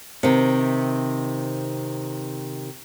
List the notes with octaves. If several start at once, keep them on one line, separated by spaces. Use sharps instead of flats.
C3 D#3